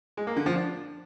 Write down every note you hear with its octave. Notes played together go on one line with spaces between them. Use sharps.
G#3
A#3
D3
F3
D4